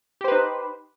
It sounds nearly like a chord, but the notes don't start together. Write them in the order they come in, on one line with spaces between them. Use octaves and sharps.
G4 C5 B4 D#4